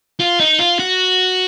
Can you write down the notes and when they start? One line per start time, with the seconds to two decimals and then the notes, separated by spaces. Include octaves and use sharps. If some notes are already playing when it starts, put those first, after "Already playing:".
0.20 F4
0.40 D#4
0.59 F4
0.79 F#4